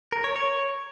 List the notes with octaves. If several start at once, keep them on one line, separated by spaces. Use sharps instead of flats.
A#4
C#5
C#5